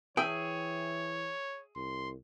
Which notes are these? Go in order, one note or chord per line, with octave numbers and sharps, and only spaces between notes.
E3 G#4 C#5 E5 G5
C2 C6